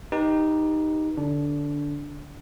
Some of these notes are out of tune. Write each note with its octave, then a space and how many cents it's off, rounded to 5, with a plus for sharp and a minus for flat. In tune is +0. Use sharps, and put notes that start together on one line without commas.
D#4 +0 G4 +0 B4 -35
D3 +0 D4 -20